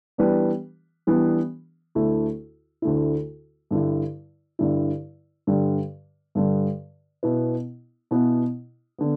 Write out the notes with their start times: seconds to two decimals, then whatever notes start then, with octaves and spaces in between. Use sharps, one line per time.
0.18 E3 G3 B3 D4 B4
1.07 E3 G3 B3 D4 B4
1.95 D2 D3 A3 E4
2.82 D2 D3 A3 E4
3.71 G2 D3 G3 E4
4.59 G2 D3 G3 E4
5.47 G2 D3 G3
6.35 G2 D3 G3
7.23 B2 B3 E4 B4
8.11 B2 B3 E4 B4
8.98 D3 B3